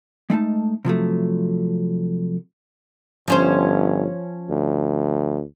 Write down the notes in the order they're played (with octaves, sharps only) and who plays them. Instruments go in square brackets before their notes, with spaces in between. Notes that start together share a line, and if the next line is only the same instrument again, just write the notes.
[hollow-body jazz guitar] G#3 A3 D#4 A5
C3 F3 F#3 A3
[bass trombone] G1 [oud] F3 C#4 C5
[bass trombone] D2